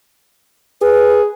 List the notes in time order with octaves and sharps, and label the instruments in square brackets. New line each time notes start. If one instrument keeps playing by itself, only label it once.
[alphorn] G#4 [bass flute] B4